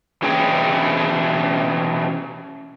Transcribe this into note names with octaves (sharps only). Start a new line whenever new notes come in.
B2 E3 C#4 G#4 C#5 G5